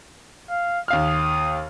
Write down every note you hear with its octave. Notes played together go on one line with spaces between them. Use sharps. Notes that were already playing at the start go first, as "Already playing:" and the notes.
F5
D#2 F5 D#6 F6